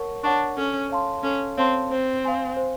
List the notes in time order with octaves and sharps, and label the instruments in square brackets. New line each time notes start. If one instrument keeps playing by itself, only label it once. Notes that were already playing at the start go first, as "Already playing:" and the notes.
Already playing: [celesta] A#4 C#5 F#5 A5 C#6
[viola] D4 [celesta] C#5 F#5 A5 C#6
[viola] C#4 [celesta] A4
[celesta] C#5 F5 A5 C6
[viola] C#4 [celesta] A4
[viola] C4 [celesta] C#5 F5 A5 C6
[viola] C4 [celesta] C5
[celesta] F5 G#5 C6
C5